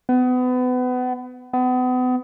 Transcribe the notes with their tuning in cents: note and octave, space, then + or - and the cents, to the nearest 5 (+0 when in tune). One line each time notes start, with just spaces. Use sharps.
B3 +30
B3 +35